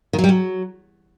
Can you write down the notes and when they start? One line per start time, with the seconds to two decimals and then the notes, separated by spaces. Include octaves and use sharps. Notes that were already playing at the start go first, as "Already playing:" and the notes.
0.13 D#3
0.19 F#3
0.24 G3
0.29 F#3